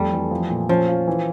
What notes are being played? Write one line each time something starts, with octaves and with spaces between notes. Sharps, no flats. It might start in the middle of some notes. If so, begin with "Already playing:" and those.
Already playing: F2 G3 A3
E3
F3
A#2
F3 C#4
F4
E3